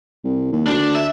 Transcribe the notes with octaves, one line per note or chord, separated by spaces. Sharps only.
C2
D#2
D2 D4
E5